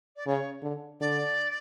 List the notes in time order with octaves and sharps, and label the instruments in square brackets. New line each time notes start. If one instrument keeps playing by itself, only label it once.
[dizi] D5
[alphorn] C#3 [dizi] C#5
[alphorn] D3
[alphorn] D3 [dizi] D5